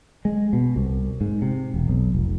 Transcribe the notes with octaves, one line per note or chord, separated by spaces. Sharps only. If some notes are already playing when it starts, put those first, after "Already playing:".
G#3
B2
C2
G#2
C3
E1
B1
F1